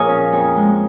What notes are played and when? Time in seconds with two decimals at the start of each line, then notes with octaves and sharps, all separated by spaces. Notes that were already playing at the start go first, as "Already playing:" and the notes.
Already playing: A#2 F3 G#4 A#4 C#5 D#5 F5 G#5
0.09 C#4
0.33 F2
0.57 G#3